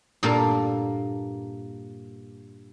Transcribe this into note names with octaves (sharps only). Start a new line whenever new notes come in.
G2 A#2 A#3 A4 A#4 A#5